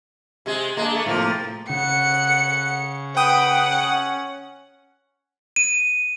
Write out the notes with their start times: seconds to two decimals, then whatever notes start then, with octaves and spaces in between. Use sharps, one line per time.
0.46 C3 G#3 G#4
0.77 G#3 A#3 D4
0.94 A3
1.06 A2 C3 F3 A#3
1.69 C#3 F#5 C#7
3.17 B4 F#5 G5 D#6
3.62 C#4
5.56 D#7